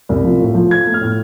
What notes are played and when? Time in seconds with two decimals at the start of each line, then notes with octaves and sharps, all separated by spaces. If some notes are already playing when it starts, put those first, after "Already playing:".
0.09 C2
0.24 F3
0.40 A2
0.55 F3
0.70 A3 G#6
0.87 A3
0.94 F6
1.01 A2